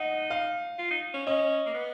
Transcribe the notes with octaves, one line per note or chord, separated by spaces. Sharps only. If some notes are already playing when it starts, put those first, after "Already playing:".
Already playing: D#4 D#5 F#5
F5
F4
D#4
C#4
C#4 D#5
A#3
B3